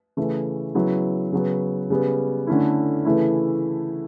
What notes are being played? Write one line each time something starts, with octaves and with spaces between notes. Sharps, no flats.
C#3 E3 A3
C#3 F#3 B3 E4
C#3 F#3 B3
C#3 G3 B3
D3 A3 C#4 E4
C#3 E3 A3 E4